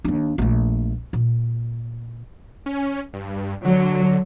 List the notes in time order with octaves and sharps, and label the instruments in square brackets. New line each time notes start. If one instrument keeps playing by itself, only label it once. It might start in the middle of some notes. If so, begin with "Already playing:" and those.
[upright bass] D#2 D4
A#1 A3
A#2
[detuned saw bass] C#4
G2
[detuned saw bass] D3 [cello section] F#3